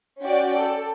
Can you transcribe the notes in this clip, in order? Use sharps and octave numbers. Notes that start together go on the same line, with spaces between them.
C#4 F#4 D5 G5
A4